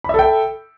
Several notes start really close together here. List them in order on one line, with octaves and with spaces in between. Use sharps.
B5 E5 A4 G5